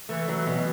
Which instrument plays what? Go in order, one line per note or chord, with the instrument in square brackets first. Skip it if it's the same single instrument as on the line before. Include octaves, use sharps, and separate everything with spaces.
[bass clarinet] E3 [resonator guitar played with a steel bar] A3
[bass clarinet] E3 [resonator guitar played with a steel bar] F#3
[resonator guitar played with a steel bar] B2